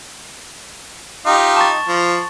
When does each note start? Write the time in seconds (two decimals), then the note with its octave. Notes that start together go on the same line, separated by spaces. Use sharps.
1.26 D#4 F4 G4
1.56 A5 C#6 A6
1.88 F3